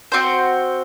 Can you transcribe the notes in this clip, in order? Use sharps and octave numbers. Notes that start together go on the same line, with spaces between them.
C4 F#4 C5